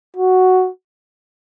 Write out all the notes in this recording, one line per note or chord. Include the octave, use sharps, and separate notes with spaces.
F#4